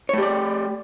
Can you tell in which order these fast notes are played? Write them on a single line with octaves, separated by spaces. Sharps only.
C#5 A3 G4 D5